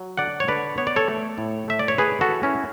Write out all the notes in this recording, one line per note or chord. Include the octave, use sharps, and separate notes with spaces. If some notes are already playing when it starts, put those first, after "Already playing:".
Already playing: F#3
D3 D5 F#5
C#5
D3 B4 D5
B3 C#5
D5
A4 C#5
A3
A2
A3 E5
D5
C#5
A3 G#4 B4
F#4 A4
E3
C#4 E4